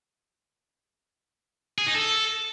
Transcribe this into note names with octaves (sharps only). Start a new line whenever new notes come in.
G#4
D#4
A4